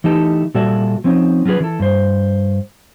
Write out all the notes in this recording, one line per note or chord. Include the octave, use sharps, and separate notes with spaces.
E3 A3 D#4 G4 D#5 A5
A#2 G3 F#4 A4 D5 E5
F3 C4 C#4 D#4
F#3 C#4 F4 G#4 B4
E3 A4
G2 C5